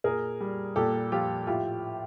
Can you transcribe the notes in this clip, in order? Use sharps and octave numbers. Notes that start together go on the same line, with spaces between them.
A#2 G#4 A#4
G3
A#2 G4 A4
F3 F4 G4
A2 F4 G4